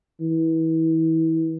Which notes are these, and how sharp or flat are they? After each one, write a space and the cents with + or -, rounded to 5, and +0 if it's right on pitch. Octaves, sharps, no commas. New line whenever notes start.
E3 -30